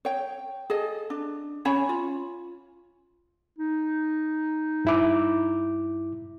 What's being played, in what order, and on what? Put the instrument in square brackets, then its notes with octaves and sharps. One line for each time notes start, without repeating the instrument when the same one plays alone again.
[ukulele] C#5 G5
G#4 A4 D#5
D4
C#4 C#5 G#5 B5
F4
[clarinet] D#4
[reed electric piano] G2 E4 D6